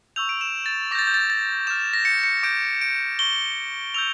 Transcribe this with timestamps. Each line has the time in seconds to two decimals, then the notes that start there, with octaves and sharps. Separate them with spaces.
0.16 C#6 E6 G6 F7
0.29 D7
0.41 E7
0.66 A6
0.91 D6 A#6
0.95 G6
0.99 A6
1.07 G6
1.14 A6
1.30 A6
1.67 D6 F6 E7
1.93 A#6
2.05 C#7
2.24 C#7
2.43 D6 G6 D7
2.81 D7
3.19 C#6 G6 G7
3.94 C#6 E6 G6 F7